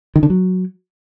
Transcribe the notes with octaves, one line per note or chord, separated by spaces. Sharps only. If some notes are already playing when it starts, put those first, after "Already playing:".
D#3
D3
F#3